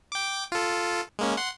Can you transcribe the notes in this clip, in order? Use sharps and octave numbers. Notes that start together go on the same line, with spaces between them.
G5 D6
F4 A4
G#3 A#3 C#4
F#5 C6